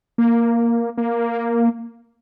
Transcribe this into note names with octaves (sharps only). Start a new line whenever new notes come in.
A#3
A#3